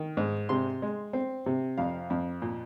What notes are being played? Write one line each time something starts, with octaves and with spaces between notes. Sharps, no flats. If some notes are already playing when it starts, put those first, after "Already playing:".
Already playing: D#3
G#2
C3 C6
G#3
C4
C3
F2 F5
F2
A#2